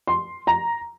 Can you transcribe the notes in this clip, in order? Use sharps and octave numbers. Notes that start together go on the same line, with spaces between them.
C6
A#5